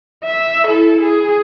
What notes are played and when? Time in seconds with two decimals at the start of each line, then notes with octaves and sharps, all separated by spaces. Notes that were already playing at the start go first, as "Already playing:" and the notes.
0.24 E5
0.65 E4 A4
1.01 G#4